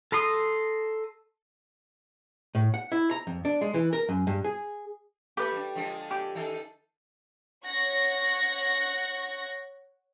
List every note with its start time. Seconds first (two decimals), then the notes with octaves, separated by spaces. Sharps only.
0.12 A4 A#5 C6 D#6
2.55 A2
2.74 F#5
2.92 E4
3.11 A#5
3.27 F2
3.45 D4
3.61 G#3
3.74 E3
3.93 A#4
4.09 F#2
4.27 G2
4.45 G#4
5.37 A3 G4 B4
5.52 G3 D4
5.75 D3 F3 G#3
6.11 G4
6.35 D#3 D#4 A4
7.65 C#5 F#5 C#6 A#6